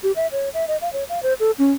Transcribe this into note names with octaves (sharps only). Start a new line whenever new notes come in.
G4
E5
C#5
E5
D#5
F5
C#5
F5
C5
A4
C#4